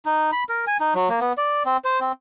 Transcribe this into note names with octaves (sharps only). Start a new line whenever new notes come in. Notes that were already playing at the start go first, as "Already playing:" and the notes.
D#4
B5
A#4
G#5
D#4
F#3
A#3
B3
D5
C4
C5
C4